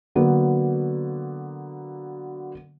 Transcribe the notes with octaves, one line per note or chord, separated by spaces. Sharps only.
D3 F#3 A#3 B3